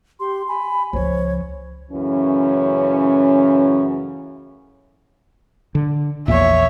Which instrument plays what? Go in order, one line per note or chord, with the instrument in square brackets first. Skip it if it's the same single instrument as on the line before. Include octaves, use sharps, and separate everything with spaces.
[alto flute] G4 [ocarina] C6
[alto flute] G#5 [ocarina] B5
[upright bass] C#2 F3 [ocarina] C5 [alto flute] C#5
[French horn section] F#2 A2 C#3 E3 C#4
[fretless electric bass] D3
[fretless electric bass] A#1 E2 A#2 [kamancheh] C#5 E5